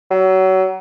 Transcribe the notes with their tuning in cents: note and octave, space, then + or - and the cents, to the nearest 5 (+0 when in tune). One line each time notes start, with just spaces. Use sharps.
F#3 +25